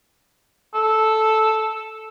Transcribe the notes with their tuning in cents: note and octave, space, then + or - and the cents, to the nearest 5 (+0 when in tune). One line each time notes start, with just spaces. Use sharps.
A4 -5